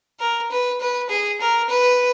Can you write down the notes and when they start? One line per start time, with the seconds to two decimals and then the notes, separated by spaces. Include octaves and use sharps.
0.20 A#4
0.51 B4
0.81 B4
1.10 G#4
1.41 A#4
1.70 B4